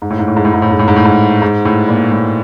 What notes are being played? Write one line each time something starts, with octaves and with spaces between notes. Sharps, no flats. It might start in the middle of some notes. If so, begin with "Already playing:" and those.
G#2
A2
G#2
A2
G#2
A2
G#2
A2
G#2
A2
G#2
A2
G#2
G#2
A2
A#2
A2